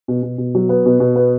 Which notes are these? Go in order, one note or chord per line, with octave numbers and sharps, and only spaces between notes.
B2
B2
B2
F#3
B3
B2
B2
B3